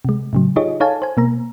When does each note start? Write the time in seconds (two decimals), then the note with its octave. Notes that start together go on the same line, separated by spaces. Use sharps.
0.05 C3 G#3
0.33 A2 C#3 F#3
0.56 D#4 F4 G4 G#4 C#5 D#5
0.80 D#4 A4 C#5 F5 G#5 A5
1.02 C5 G#5
1.17 B2 A#3 A#5